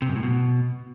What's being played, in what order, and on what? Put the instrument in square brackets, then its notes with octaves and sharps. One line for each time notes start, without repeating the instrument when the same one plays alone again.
[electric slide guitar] C3
F#2
A2
B2